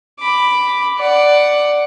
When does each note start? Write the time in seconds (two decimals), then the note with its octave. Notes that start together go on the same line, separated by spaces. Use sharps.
0.20 B5 D6
0.98 D5 F#5